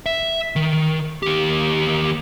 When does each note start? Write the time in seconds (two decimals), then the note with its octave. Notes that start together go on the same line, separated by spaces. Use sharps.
0.06 E5
0.56 D#3
1.23 D#2 G4